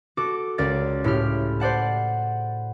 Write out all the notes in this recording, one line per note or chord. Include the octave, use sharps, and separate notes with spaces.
F#4 A4 D6
C#2 A#4 D5 A6
A2 E4 G4 F6
C5 D5 F#5 A5